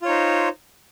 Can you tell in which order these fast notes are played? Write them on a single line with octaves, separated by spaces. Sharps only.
F4 C#5 D#4 C5